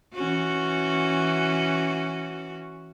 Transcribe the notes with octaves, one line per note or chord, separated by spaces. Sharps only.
E3 C#4 F#4